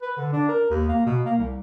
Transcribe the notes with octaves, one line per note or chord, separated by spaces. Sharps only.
B4
D3
D4
A#4
D#2
A#3
B2
A#3
C2